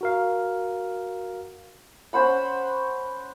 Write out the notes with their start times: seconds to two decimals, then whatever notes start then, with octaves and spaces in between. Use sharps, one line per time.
0.01 F#4 A#4 F5
2.13 C#4 C5 F#5 B5